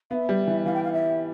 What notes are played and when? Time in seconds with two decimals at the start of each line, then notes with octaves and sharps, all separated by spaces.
0.10 B3 E5 F5
0.29 G3
0.47 E3
0.65 E3 F5
0.74 G5
0.84 F5
0.93 E5